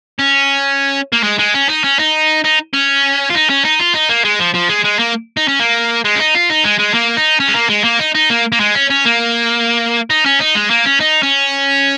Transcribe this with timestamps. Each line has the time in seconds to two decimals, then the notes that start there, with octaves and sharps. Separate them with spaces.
0.19 C#4
1.13 A#3
1.24 G#3
1.39 G#3
1.54 C#4
1.69 D#4
1.84 C#4
1.99 D#4
2.44 D#4
2.74 C#4
3.30 F4
3.34 D#4
3.50 C#4
3.65 D#4
3.80 F4
3.94 D#4
4.09 A#3
4.25 G#3
4.40 F3
4.54 F3
4.69 G#3
4.85 G#3
4.99 A#3
5.37 D#4
5.48 C#4
5.60 A#3
6.05 G#3
6.15 C#4
6.20 D#4
6.35 F4
6.50 D#4
6.65 G#3
6.80 G#3
6.95 A#3
7.17 D#4
7.40 C#4
7.48 G#3
7.55 A#3
7.70 G#3
7.85 A#3
8.00 D#4
8.15 D#4
8.30 A#3
8.52 A#3
8.60 G#3
8.75 C#4
8.90 C#4
9.05 A#3
10.10 D#4
10.26 C#4
10.40 D#4
10.55 G#3
10.70 A#3
10.85 C#4
11.00 D#4
11.23 C#4